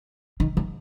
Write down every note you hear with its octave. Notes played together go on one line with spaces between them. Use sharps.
D#3
D#3